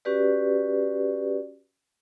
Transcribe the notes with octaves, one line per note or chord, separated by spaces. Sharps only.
C#4 F#4 G4 B4 D5